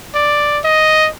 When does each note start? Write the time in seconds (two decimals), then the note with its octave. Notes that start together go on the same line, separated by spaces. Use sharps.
0.15 D5
0.64 D#5